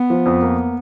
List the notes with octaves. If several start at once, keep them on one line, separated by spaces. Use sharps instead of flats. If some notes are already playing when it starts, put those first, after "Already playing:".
Already playing: B3
F3
F2
A#3